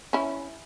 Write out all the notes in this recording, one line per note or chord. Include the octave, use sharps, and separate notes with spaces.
C#4 E4